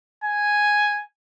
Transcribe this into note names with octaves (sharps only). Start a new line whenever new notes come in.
G#5